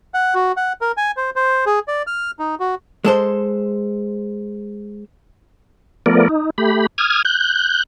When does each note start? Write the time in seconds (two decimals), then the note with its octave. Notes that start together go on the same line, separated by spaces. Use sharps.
0.14 F#5
0.35 F#4
0.57 F#5
0.81 A#4
0.97 G#5
1.17 C5
1.36 C5
1.66 G#4
1.88 D5
2.07 F6
2.39 D#4
2.60 F#4
3.04 G#3 A4 C5
6.06 F3 A3 B3 A#4 D5
6.29 D#4
6.58 A3 G4 B5
6.98 D#6 F6 G#6
7.25 F#6 G6